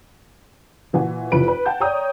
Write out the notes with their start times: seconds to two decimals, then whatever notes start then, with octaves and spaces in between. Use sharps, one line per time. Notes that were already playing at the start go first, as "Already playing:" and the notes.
0.93 A#2 E3 F#4 G#5
1.32 F1 E3 F4 B4 D7
1.48 B4
1.66 F#5 G5 A5 G6
1.80 C#5 D5 G5 A#5 D#6